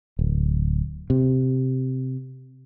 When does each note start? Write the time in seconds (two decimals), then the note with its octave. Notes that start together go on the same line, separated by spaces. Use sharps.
0.19 D1
1.10 C3